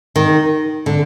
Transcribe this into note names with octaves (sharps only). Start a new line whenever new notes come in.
D#3
D3